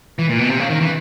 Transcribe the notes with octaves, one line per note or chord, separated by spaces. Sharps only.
E3
A#2
B2
C3
C#3
D#3
E3